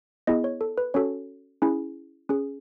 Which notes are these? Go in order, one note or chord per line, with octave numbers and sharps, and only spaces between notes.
B3 E4 G#4 D#5
C#5
A4
B4
C#4 F#4 A4 C#5
C#4 E4 G#4
C#4 G#4